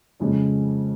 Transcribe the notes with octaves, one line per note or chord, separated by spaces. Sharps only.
F2 C#3 F3 G#3 C#4